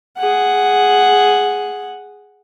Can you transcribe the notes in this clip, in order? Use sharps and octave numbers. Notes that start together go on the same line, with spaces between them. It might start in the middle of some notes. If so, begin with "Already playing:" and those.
G#4 F#5